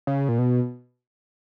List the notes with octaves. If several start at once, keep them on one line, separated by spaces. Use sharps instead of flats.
C#3
A#2
B2